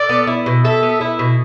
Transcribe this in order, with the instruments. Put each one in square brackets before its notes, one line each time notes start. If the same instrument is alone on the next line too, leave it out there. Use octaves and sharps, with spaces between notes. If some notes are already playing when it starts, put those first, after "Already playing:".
Already playing: [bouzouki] A4 [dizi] D5
[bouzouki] B3
E4
B2
[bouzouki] A4 [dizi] E5
[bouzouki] B3
E4
B2